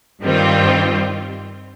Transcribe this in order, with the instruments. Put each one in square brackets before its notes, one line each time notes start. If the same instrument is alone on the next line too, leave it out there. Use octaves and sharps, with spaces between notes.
[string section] G2 D#3 G3 C4 F4